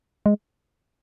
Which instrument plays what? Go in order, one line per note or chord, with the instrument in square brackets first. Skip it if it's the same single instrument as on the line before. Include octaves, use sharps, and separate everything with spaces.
[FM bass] G#3